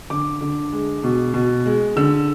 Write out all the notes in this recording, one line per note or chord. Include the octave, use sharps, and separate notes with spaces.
D3 D6
D3
G#3
B2
B2
G#3
D3 E6